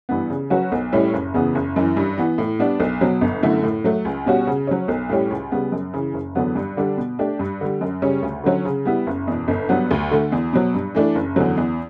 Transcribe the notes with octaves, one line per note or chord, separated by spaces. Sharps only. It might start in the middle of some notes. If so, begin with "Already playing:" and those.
G2 E3 B3
C#3
F#3 C#4 F#4 B4
B1
A2 G3 C#4 E4
F#1
E2 C#3 E3 B3
F#1
F#2 E3
G2
E3 B3
A2
G3 B3 D4
B1
B2 F#3
G1
F#2 D3 A3 E4
A2
F#3 A3
C#2
B2 G3 C#4 F#4
C#3
F#3 C#4
B1
A2 G3 C#4 G4
C#2
C#3 G3 B3
F#2
C#3 E3
F#1
E2 D3 F#3 B3
G2
D3 G3 D4
B2
A3 D4 G4
G2
D3 G3
F#2
C#3 G3 C#4
D2
D3 F#3 C#4
C#3
G3 B3 E4
F#1
E2 B2
G1
G2 F#3 B3
D2
D3 A3
E2
B2 F#3
G2
E3 A3 D4
F#1
E2 D3 F#3
E2